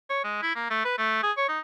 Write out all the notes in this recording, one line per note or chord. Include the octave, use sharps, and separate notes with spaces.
C#5
G#3
E4
A#3
A3
B4
A3
G#4
C#5
D#4